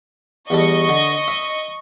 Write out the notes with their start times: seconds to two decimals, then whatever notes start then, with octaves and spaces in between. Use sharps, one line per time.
0.50 E2 G3 A4 D#5 C#6
0.89 D3
1.28 E5